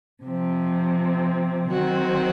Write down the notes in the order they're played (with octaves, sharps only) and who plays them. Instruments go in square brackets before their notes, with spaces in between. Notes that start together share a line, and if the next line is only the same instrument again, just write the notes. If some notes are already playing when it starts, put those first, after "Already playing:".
[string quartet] C3 F3 C4
D#3 F#3 C4 F#4